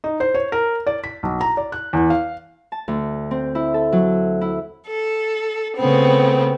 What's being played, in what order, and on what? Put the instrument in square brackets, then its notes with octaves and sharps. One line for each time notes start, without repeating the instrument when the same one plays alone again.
[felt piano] D#4
C5
C#5
A#4
D5
B6
B1
A#5
D5
F#6
E2
F5
[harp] A5
D2
C4
E4
A4
F#3
E4
[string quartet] A4
C#3 A3 B3 C4